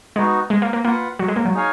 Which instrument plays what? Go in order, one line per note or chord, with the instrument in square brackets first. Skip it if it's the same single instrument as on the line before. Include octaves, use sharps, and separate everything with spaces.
[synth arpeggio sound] G#3 [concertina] B3 D#4 F#4
[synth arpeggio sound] G#3
A#3
A#3
[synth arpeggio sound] A#3 [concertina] F4 B4 F#5
[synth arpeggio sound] F#3
G#3
A#3
F#3
[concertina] D#4 G#4 C#5 F5 G#5